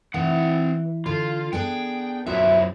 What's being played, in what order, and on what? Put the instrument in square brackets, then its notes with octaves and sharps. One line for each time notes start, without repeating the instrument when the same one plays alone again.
[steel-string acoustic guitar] E3 [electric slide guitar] C4 F#5
[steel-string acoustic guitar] D3 [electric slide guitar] F4
[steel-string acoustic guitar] B3 D4 G#4 [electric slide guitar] G5
[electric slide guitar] F#2 F3 E4 [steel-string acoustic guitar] F#4 E5